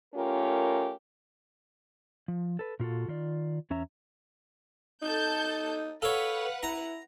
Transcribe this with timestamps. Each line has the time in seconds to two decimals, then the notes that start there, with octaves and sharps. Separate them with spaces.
0.15 A3 C#4 F4 G4 A#4
2.28 F3
2.59 A4 B4
2.80 A#2 F4 F#4 A4
3.08 D#3 F4 D5
3.70 E2 C#4 E5 A#5
5.02 D#4 A4 A5 G6
6.02 A4 B4 C#5 F5 F#5
6.63 E4 A#5